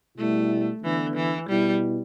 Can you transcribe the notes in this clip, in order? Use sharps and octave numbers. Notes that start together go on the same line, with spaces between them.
B2 G3 A3 E4
D3 E3 B3 D4
E3
B2 G3 B3 E4